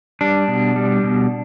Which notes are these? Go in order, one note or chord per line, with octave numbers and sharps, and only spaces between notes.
G3 D4
B2
G3
B2